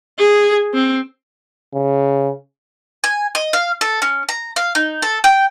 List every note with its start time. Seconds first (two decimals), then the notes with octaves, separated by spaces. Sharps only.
0.19 G#4
0.74 C4
1.74 C#3
3.04 G#5
3.35 D#5
3.53 F5
3.81 A4
4.02 C#4
4.29 A#5
4.56 F5
4.75 D#4
5.02 A4
5.24 G5